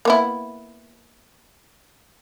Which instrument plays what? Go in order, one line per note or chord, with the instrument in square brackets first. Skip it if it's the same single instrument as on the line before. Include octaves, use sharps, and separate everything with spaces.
[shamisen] A#3 B3 E4